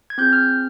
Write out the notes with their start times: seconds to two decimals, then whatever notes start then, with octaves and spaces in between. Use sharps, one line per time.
0.10 G#6
0.18 C4 F4 G#4 G6
0.33 F6